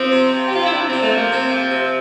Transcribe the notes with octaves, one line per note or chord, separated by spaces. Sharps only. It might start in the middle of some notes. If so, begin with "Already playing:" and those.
Already playing: F3 C4
C3
F3
G4
C3 F4
E4
F3 D4
C3 C4
A3
F3 A#3
C3 C4
F3
C3